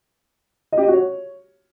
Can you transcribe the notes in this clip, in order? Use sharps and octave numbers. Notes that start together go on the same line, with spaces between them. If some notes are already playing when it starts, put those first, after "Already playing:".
D#5
G4
D#5
F#4
C#5